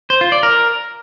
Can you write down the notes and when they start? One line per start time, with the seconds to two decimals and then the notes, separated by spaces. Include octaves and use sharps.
0.10 C5
0.21 F4
0.32 D5
0.43 A#4